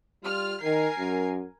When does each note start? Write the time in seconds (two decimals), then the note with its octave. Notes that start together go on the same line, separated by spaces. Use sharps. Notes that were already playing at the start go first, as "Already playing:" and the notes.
0.24 G3 F4 F6
0.62 D#3 A#4 G#5 C7
0.99 F#2